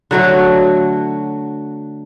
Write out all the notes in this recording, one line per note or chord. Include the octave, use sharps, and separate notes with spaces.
D3 F#3 A3 F#4